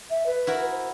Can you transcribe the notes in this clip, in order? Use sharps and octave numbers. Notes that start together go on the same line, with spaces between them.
E5
B4
E4 F#4 A#4
C5